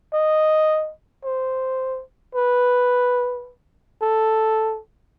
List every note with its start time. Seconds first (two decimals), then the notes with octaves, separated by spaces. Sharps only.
0.13 D#5
1.24 C5
2.35 B4
4.02 A4